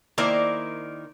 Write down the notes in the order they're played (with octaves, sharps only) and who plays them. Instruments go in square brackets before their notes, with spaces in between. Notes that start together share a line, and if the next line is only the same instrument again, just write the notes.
[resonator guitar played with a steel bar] D#3 A#3 E4 A#4 C5 D5